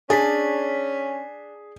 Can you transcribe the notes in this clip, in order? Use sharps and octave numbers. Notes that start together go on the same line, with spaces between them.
C#4 D4 G#4 G#5 B6